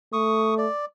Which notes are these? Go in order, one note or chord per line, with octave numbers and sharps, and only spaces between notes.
A3 C#6 D#6
D5